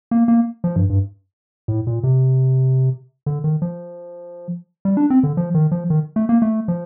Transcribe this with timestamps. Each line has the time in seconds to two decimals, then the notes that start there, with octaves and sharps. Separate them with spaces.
0.11 A#3
0.28 A#3
0.64 F3
0.76 G2
0.90 G2
1.68 A2
1.87 A#2
2.03 C3
3.26 D3
3.44 D#3
3.62 F3
4.85 G3
4.97 D4
5.10 C4
5.23 D3
5.37 F3
5.54 D#3
5.72 F3
5.90 D#3
6.16 A3
6.29 A#3
6.42 A3
6.68 F3